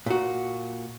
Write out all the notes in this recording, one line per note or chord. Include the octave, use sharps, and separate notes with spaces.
A#2 F#4